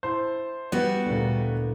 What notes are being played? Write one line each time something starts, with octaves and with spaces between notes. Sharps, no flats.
E4 C5 A5
G3 B3 F#4
D2 A#2